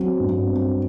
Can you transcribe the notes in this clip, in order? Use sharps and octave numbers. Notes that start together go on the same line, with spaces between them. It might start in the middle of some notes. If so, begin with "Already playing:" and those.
Already playing: F#3 C4
G2
C4